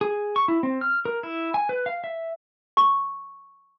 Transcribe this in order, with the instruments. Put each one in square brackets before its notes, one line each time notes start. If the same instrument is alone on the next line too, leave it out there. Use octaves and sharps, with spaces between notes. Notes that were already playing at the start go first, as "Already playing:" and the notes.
[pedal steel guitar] G#4
C#6
E4
C4
F6
A#4
E4
G#5
B4
F5
E5
[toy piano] C#6